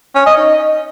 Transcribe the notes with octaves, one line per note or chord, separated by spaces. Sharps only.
C#4
D#5
D#4